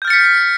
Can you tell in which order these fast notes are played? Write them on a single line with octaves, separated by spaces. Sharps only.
G6 F6 A6 C#7 B6